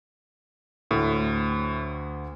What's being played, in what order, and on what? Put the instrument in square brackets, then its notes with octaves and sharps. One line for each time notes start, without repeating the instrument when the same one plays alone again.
[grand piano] D2 [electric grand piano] A2